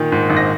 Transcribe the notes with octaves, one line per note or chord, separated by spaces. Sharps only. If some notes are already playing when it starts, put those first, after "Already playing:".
Already playing: A#2 D#3
G#2
G#1
A#6